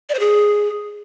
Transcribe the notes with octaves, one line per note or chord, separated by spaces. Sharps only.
D5
C5
G#4